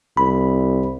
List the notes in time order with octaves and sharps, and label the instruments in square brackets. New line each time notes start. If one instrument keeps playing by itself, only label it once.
[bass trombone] C2 [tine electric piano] B5